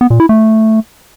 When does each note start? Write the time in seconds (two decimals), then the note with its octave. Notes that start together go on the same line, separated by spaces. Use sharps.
0.01 B3
0.10 A#2
0.20 E4
0.29 A3